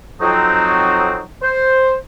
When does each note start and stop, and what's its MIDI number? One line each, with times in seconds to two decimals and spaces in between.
0.21 1.21 41
0.21 1.21 54
0.21 1.21 60
0.21 1.21 63
1.42 1.94 72